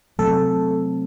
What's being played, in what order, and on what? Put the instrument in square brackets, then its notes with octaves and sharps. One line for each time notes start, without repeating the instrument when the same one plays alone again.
[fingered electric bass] C3 F#3 A3 C4 [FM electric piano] A4